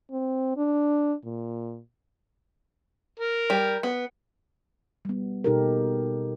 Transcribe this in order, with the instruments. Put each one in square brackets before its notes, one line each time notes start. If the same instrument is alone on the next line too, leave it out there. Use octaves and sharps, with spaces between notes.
[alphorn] C4
D4
A#2
[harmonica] A#4
[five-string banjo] G3
B3
[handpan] G3 B3
B2 D#4 G4 A4 A#4